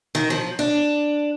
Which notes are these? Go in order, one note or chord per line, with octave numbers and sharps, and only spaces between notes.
D#3
F3
D4